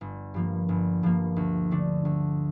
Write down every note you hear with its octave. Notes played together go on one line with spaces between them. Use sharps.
G1
G2 F3 A#3
G1
G2 F3 A#3
D2
D3 A3 D4
D2